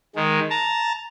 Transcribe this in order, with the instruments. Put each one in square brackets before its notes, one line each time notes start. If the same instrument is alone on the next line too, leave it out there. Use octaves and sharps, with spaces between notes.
[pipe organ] D#3 G#3
A5 A#5